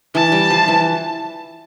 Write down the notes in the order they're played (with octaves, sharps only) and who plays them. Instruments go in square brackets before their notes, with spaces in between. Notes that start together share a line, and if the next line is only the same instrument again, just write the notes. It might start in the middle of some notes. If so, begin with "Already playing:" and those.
[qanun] E3 [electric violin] A5
[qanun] G3
F3
E3